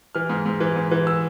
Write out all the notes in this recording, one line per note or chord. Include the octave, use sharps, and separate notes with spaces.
E3 F6
G#2
G#2
E3
G#2
E3
E6